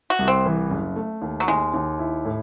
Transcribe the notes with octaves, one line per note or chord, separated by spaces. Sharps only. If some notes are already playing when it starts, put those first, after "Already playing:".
F#4
C2
C4
E3
F#1
A3
D#2
F#3
D#2 G#3
D#2
E4
A2